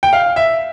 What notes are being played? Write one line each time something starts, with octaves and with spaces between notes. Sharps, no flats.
G5
F5
E5